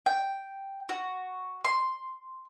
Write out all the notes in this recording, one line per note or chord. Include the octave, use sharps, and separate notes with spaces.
G5
F#4
C6